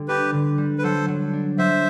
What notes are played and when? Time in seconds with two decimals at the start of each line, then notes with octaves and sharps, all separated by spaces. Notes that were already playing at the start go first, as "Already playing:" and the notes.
Already playing: D3 G3
0.08 D4 G4 B4
0.34 D3
0.58 G3
0.78 B4
0.83 F#3 A4 C5
1.08 F#3
1.33 D4
1.58 F#3 C5 E5